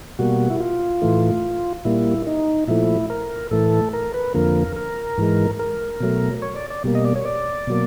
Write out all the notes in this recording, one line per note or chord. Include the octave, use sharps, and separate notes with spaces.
B2 G3 A#3 F#4
E4
F4
A2 E3 A3
A#2 G3 A#3 E4
D#4
A#2 F3 A3 E4
A#4
A2 E3 A3 A4
A#4
B4
F2 D3 F3 A#3 A#4
A#4
G#2 E3 G#3
A#4
B2 F#3 A3
C#5
D5
D5
B2 G3 A#3
D#5
D5
C#5
D5
B2 F#3 A#3